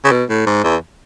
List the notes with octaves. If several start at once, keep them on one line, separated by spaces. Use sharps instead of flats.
C#3
B2
A2
G#2
E2